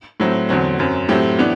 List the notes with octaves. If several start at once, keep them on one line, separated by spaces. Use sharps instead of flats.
A2 F#3 C4
E2 D3 F#3 C4
F#2 F#3 C4
A2 F#3 C4 G4
E3 B3 D4